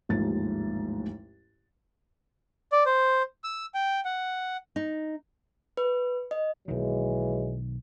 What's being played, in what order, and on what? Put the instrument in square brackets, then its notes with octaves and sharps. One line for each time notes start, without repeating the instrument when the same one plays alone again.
[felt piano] A1 D#2 G#2 F3 A3 A6
[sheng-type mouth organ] D5
C5
E6
G5
F#5
[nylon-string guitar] D#4
[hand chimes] B4
D#5
[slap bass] B1 D#3 [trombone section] E3 F#3 G#3